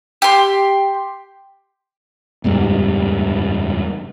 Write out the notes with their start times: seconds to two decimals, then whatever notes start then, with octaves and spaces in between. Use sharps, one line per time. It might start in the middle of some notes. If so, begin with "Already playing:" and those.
0.22 G4 C6
2.44 F#1 E2 G#2 G3